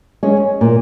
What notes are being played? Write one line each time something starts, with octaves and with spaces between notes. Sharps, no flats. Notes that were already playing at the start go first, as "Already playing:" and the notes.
G#3 C#4 G#4
A#2